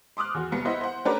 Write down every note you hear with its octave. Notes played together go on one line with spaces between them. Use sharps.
C6 D6 D#6 F6 F#6
E2 F#4
C2 B3 C#7
B3 E4 C5 D#5 E5 F#5
C5 F#5
A3 C#4 D4 G4 A#4 B4